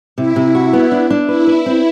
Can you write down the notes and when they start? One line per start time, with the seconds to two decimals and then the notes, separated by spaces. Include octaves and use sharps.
0.17 C3 E4
0.36 C3
0.55 F#4
0.73 B3
0.92 D4
1.10 D4
1.29 E4 B4
1.47 B4
1.66 C4